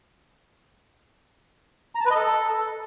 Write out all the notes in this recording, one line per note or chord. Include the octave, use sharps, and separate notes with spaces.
A#5
A5
B4
D#5
A4